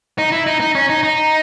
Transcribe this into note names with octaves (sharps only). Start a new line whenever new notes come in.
D#4
E4
D#4
D#4
C#4
D#4
D#4